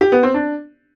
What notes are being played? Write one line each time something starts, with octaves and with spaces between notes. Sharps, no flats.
G4
B3
C4
D4